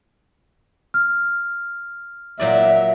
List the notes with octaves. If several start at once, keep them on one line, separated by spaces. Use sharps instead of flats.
F6
A#2 F#3 D5 E5